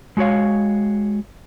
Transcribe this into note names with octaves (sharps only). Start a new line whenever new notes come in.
G#3 F#4 G4 C#5 F5